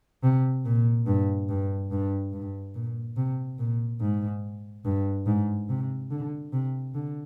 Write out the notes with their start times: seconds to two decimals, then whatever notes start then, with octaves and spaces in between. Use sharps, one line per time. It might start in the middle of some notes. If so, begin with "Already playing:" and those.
0.23 C3
0.65 A#2
1.06 G2
1.49 G2
1.91 G2
2.33 G2
2.74 A#2
3.16 C3
3.59 A#2
4.00 G#2
4.85 G2
5.26 G#2
5.69 C3
6.11 D3
6.53 C3
6.94 D3